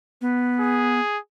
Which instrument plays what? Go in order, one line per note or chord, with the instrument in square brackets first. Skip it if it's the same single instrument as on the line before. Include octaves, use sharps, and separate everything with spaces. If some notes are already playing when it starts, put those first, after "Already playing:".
[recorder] B3
[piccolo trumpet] G#4